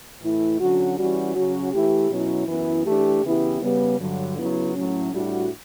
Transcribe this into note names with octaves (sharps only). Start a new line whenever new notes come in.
A2 E3 A3 E4
D3 F#3 C#4 F#4
E3 G3 C#4 F#4
C#3 F#3 C#4 F#4
E3 A3 E4 G4
B2 F#3 C#4 E4
F#2 E3 B3 E4
E3 A3 D4 G4
C#3 E3 B3 E4 G4
C#3 G3 B3
G2 D3 F#3
C#3 F#3 B3 E4
A2 F#3 C#4
A2 G3 D4 F#4